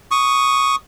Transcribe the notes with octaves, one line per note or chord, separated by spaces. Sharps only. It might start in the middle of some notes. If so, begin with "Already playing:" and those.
C#6 D#6